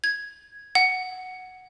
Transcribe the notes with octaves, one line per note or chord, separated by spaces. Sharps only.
G#6
F#5